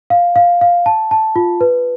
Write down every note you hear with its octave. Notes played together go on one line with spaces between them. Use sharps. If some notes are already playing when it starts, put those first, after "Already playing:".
F5
F5
F5
A5
A5
F4
B4